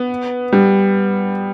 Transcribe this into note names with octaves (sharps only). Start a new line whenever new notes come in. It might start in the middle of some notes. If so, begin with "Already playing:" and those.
Already playing: B3
G3